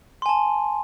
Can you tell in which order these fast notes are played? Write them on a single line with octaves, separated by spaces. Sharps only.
C6 G#5 A5